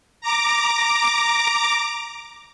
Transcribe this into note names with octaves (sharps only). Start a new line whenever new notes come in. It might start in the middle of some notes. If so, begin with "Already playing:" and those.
A#5 D6